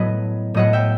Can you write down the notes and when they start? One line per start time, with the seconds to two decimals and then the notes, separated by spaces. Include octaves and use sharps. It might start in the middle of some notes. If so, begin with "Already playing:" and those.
Already playing: A2 F#3 B3 B4 D#5
0.54 A2 F#3 B3 D#5 F#5
0.73 E5 G5